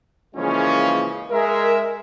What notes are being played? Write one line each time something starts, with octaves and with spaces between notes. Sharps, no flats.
C#3 E3 F3 G#3 A#3 C#4
G#3 A#4 E5